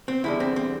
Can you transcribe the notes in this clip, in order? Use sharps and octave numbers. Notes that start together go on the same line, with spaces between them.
C4
E2 D3 G3 E4
C4
C4